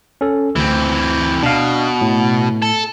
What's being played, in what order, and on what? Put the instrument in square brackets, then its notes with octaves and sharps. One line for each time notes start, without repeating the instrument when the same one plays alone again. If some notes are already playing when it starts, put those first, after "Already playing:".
[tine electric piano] C#4 A4
[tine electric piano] D2 [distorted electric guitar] E3 C4
[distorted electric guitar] B2 [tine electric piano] D4 F5
[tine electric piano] A2
[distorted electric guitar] A4